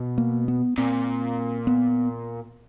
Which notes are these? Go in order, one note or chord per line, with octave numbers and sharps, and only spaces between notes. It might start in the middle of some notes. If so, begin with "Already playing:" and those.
Already playing: B2
A#3
B3
A#2 C4
B3